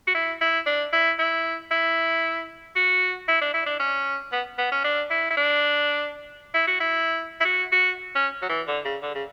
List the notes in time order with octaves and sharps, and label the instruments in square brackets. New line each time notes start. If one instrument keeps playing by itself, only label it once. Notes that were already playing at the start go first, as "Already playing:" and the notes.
[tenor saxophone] F#4
E4
E4
D4
E4
E4
E4
F#4
E4
D4
E4
D4
C#4
B3
B3
C#4
D4
E4
E4
D4
E4
F#4
E4
E4
F#4
F#4
C#4
F#3
E3
D3
C#3
D3
C#3